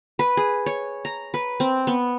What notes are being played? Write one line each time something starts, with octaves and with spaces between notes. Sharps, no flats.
B4
G#4
C#5
A#5
B4
C4
B3